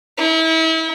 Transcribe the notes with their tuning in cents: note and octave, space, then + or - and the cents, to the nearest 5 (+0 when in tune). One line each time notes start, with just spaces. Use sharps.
E4 -35